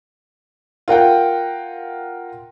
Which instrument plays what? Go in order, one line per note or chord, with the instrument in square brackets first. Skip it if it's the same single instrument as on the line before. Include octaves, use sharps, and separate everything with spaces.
[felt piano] F4 A#4 F#5 G5